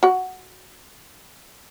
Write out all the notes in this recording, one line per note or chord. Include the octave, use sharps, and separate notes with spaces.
F#4 F#5